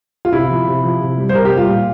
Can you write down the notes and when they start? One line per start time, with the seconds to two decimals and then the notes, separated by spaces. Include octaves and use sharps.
0.25 F4
0.32 C3 E4
0.50 F3
0.67 C3
0.84 F3
1.01 C3
1.17 G3
1.29 C5
1.35 C3 A#4
1.45 G4
1.51 G3
1.57 F4
1.69 A#2